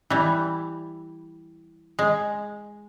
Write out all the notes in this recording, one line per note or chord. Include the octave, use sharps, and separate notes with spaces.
E3 G3
G#3